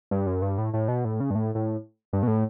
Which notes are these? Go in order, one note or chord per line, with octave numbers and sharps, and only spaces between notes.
G2
F#2
G2
A2
A2
B2
A2
C#3
G2
A2
A2
G2
B2
A2